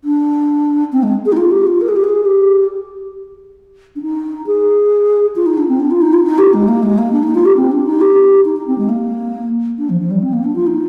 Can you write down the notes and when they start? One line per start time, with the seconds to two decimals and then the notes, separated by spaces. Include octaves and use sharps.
0.04 D4
0.92 C4
1.03 G#3
1.26 G#4
1.32 D#4
1.37 F4
1.51 G4
1.66 F4
1.81 A#4
1.88 G#4
1.96 G4
2.04 G#4
2.25 G4
3.96 D4
4.02 D#4
4.47 G#4
5.36 F4
5.46 D#4
5.57 D4
5.68 C4
5.80 D4
5.91 F4
6.01 D#4
6.13 F4
6.24 D#4
6.38 G4
6.53 G#3
6.68 A#3
6.83 G#3
6.98 A#3
7.12 D4
7.23 D#4
7.35 F4
7.45 G4
7.57 C4
7.71 D4
7.86 D#4
8.01 G4
8.45 D#4
8.56 D#4
8.67 C4
8.78 G#3
8.89 A#3
9.78 D4
9.89 F3
10.00 F3
10.11 G3
10.22 C4
10.33 A#3
10.44 D4
10.56 F4
10.66 D#4